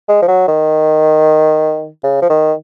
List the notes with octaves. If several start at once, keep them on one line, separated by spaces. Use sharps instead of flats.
G#3
F3
F#3
D#3
C#3
F3
D#3